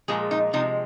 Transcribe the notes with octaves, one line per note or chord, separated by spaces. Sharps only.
A#2 F3 G#3 G#4
D#4
C3 F3 G#3 D#4